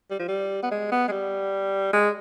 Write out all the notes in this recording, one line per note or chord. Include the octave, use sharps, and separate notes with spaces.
G3
F3
G3
B3
G#3
B3
G#3
G3
G#3